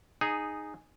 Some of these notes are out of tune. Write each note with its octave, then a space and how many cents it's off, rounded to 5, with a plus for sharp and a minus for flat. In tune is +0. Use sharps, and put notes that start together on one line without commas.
D#4 -10 G#4 +0